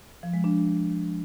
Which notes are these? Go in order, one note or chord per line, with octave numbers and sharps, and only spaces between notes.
F3
G#3
D4